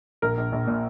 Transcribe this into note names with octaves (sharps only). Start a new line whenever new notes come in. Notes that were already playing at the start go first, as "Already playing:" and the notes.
A#1 A#4
A#1
A#1
A#2